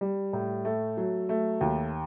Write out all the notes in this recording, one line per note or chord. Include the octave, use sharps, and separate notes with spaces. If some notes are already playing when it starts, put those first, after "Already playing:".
G3
A2
A3
F#3
A3
D#2